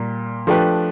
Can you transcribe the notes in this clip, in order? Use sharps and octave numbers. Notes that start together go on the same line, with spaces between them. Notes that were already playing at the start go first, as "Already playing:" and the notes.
Already playing: A#2 G3 A#3
F3 A3 D4 G4 B4